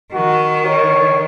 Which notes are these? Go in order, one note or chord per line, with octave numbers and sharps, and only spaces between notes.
D#3 F#4
C#5